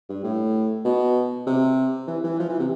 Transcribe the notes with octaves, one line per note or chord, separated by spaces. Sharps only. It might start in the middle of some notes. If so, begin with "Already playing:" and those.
G2
A2
B2
C3
E3
E3
F3
E3
C3